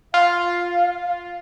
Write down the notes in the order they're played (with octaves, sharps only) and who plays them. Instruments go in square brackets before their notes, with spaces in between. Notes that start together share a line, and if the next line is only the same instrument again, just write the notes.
[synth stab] F4 [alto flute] F5